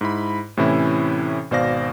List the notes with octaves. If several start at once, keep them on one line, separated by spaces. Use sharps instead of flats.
G#2 E4 B5
A2 C3 E3 C#4 E4
G#1 B2 C5 D5 F5 A#6